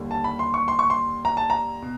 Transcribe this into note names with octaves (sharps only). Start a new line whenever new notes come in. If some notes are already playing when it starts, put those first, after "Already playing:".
Already playing: D#2 D3 G3
A5
B5
C6
C#6
C6
C#6
C6
A#5
A5
A#5
B2